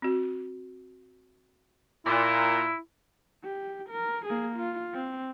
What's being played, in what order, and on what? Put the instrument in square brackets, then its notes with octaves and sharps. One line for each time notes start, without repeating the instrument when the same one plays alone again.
[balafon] C4 F#4
[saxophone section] A#2 [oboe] E4 [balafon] D6
[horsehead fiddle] G4
A#4
A#3 G#4
F4
C4